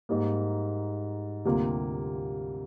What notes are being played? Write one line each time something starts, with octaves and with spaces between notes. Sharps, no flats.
G#2 G3 A#3
D2 C3 G3 A#3 F4